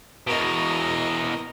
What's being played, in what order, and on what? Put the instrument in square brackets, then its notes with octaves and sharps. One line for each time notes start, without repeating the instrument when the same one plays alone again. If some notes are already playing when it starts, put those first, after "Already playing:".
[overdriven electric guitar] E2 B2 [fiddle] A#4 D#5